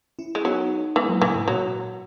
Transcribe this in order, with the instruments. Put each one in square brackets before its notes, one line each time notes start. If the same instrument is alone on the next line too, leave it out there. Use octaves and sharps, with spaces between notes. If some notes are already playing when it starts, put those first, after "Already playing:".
[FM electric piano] C#4 E4
[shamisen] G#3
[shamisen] F#3 [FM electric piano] B3 D#4
[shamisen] E3 [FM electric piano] G#3 B3
[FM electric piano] F#3 A#3
[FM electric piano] A#2 C#3 [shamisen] E3
[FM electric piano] G#2 B2
[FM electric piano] A#2 [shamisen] F#3